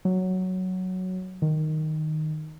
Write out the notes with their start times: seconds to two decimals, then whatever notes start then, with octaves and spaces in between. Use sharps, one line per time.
0.05 F#3
1.42 D#3